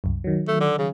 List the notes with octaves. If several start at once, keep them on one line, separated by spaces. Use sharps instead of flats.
C2 F#2
D#3 F#3
A3
D3
C#3